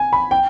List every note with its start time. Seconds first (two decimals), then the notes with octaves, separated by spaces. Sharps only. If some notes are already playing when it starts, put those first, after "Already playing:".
Already playing: G#5
0.13 B5
0.31 G5